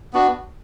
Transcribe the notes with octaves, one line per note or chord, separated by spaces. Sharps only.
B3 D4 F#4